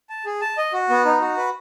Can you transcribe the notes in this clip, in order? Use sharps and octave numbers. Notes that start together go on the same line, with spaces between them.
A5
G#4
A5
D#5
F#4
B3
D#4
F#4
B4